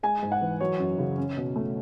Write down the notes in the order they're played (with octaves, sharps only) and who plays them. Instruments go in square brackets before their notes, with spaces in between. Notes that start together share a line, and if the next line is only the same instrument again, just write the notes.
[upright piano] G#3 G#5
G#2
F#5
E3
F#3 C#5
F#2
C#3
C#4
B2
A3